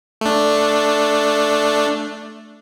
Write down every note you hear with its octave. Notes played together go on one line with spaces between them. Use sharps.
A3 D4